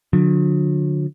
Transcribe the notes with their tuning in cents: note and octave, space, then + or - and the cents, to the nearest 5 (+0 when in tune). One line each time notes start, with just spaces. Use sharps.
D3 +0 F#3 -45